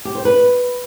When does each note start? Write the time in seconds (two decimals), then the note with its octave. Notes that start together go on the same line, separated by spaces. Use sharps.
0.05 G4
0.15 C5
0.25 B4